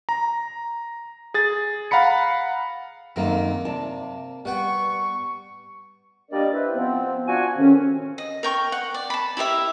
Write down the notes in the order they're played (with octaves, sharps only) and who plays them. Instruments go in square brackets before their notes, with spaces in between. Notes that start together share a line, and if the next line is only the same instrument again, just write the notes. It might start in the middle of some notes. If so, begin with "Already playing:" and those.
[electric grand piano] A#5
G#4 A6
F5 F#5 A#5 B5 C#7
[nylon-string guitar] F#2 D#3 A3 [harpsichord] A#3 C4
[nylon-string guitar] C3 D5 A5
[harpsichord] G3 F#5 G5 [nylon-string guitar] B3 [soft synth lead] C#6
[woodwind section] G3 A#3 D4 A#4 D5 D#5
E4 B4 C5
F3 B3 C4
D4 F4 F#4 F#5 G#5
A2 C3 D#3 C4 C#4
[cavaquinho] D#5
A#4 G5 C#6
F#5
D5
A5 B5
E4 G4 A#4 E5